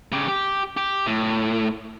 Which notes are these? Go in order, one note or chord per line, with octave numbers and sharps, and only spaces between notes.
C#3 G4
G4
G4
A2